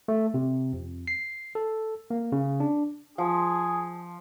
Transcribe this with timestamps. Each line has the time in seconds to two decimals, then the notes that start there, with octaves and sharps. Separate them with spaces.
0.08 A3
0.34 C3
0.73 F2
1.08 C7
1.55 A4
2.10 A#3
2.32 C#3
2.60 D4
3.18 F3 G#4